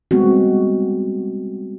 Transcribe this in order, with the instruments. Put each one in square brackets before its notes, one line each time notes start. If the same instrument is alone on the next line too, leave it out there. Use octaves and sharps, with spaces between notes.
[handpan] G3 G#3 B3 C4 F#4